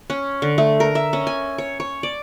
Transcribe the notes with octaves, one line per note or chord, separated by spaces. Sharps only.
C#4
D3
A3
A#4
E5
C#4
G#5
C#5
C#5
D5